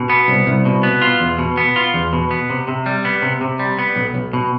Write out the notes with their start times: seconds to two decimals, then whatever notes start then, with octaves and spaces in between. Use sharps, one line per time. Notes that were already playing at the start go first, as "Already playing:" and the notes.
Already playing: B2
0.10 B3
0.28 C2
0.47 C2
0.65 B2
0.83 B3
1.02 F4
1.20 E2
1.39 B2
1.58 B3
1.76 F4
1.94 E2
2.13 B2
2.31 B3
2.50 C3
2.68 C3
2.86 G3
3.05 B3
3.22 C3
3.41 C3
3.59 G3
3.79 B3
3.96 B1
4.15 B1
4.33 B2